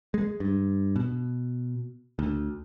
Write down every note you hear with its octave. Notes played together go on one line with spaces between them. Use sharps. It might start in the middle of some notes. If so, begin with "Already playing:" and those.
G#3
G2
B2
D2